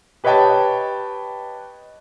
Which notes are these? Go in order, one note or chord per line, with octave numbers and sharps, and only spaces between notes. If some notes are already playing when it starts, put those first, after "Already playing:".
G4 B4 C#5 D#5 G5 A5